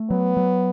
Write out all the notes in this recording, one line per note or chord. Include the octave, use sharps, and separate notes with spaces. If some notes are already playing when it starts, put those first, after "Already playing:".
Already playing: A3
F#3 B3
F#3